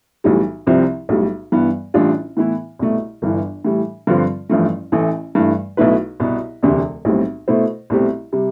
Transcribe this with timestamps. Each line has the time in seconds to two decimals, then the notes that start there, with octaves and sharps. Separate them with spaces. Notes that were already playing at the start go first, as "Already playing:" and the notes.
0.24 B1 A2 E3 G3
0.67 C2 C3 F3 C4
1.09 B1 A2 G3
1.52 G2 E3 B3
1.94 A1 A2 G3 D4 F4
2.37 A2 E3 B3 E4
2.79 C2 B2 A3
3.22 G1 G2 E3
3.65 A2 E3 G3
4.07 G2 D3 F3 C4 F4
4.50 A1 G2 F3 A3
4.92 A1 A2 E3 A3
5.35 G2 E3 A3
5.77 B1 B2 A3 E4 B4
6.20 C2 B2 B3
6.63 E1 D2 C3
7.05 B1 A2 G3 C4
7.48 B2 A3 E4 A4 C5
7.90 C2 B2 A3 C4 G4
8.33 C3 G3